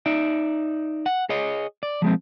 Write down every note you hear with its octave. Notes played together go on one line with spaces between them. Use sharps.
D#4 D5 E5
F#5
G#4 C#5 D#5
D5
F3 G#3 C4